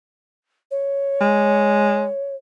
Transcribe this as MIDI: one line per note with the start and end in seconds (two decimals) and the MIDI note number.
0.71 2.35 73
1.21 2.08 56